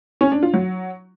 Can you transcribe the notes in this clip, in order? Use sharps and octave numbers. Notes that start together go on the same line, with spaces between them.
C#4
D4
F4
F#3